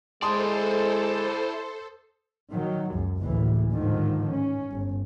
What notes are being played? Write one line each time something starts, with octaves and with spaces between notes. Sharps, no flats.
G#3 E4 A4 C5 D5 A5 C6 D#6
D#3 F#3
C#2 F#2
F#1 D2 A2 E3
G#2 D3 D#3 F3
C#4
G1